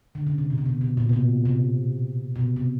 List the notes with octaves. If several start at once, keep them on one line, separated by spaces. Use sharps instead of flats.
D3
C#3
C3
B2
C3
B2
B2
A#2
C3
B2
C3
B2
C3
C3